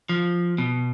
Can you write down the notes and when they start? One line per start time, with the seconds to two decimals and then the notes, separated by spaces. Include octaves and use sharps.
0.09 F3
0.58 B2